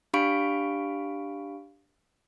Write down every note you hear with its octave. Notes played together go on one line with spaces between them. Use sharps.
D4 G4 F5 B5 C#6 D7